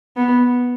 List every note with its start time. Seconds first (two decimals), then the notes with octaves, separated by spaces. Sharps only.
0.17 B3